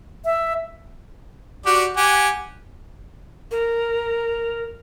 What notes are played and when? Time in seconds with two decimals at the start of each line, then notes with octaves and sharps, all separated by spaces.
0.25 E5
1.66 F#4 G4 D5
1.97 G4 F#5 G#5
3.51 A#4